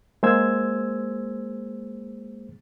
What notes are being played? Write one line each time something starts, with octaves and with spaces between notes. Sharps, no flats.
G#3 A#3 G#4 C5 E6 G#6